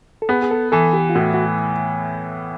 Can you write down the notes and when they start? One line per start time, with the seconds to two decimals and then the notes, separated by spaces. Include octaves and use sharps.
0.22 A4
0.29 B3 G#4
0.43 G#4
0.51 A4
0.72 E3 A4
0.93 G4
1.09 F4
1.15 A2 F#4
1.34 F#4